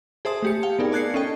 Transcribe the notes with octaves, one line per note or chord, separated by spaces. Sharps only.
G#4 C5 E5 A5 D#6
A3 G4 C#7
F5 G5
B3 D#4 G#4 A#4 D5
D5 A5 F#6 G#6 C7 C#7
C#4 A4 D#5 G5